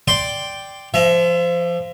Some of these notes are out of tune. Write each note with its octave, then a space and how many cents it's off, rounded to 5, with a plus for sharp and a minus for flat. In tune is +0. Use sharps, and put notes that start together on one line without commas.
D5 +0 G5 +0 C6 +0
F3 -20 E5 +25